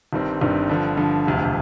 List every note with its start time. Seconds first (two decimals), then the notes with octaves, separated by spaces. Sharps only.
0.13 G1 G2 D#3 G3 C4
0.41 G1 G2 D#3 G3 C4
0.69 G2 D3 F3
0.97 G2 D3 F3
1.26 E1 D2 C3 F3